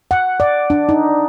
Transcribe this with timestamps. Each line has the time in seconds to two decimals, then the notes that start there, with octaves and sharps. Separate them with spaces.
0.11 F#5
0.40 D5
0.70 D4
0.89 D#4